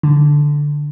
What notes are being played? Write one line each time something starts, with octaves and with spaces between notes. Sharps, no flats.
D3